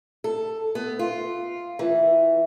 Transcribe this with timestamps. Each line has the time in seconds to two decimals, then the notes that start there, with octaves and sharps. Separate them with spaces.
0.24 A4
0.75 B3
0.99 F4
1.79 E3